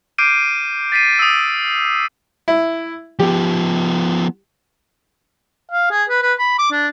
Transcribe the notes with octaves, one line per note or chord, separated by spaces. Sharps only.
D6 F6 G6 C7 D7 D#7
A6 B6 C7 D#7
D#6 E6
E4
F3 B3 G4
F5
G#4
B4
B4
B5
D6
D4